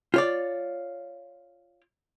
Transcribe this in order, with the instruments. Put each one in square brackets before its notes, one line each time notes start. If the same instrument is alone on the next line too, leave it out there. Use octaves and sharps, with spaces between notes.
[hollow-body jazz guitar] F4 C#5 D5